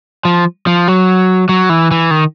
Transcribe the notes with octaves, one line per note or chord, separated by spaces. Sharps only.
F3
F3
F#3
F#3
E3
E3
D#3